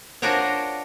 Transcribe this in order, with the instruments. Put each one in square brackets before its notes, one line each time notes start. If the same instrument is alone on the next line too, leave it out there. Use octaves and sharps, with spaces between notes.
[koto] D4 F4 F#4 A#4 C5 C#5